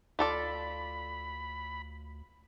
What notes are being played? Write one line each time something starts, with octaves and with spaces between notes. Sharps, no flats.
D2 F4 A4 D5 B5